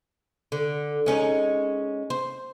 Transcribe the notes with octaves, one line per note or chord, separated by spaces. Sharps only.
D3
G#3 C#4 D#4
C5